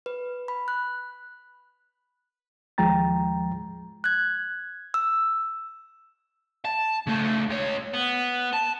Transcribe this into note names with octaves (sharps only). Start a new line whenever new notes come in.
B4
B5
F#6
D#2 F3 G#3 G5 A#5 A6
F#6 G#6
E6
A5
C#3 A3
C#2 C#5
B3
A5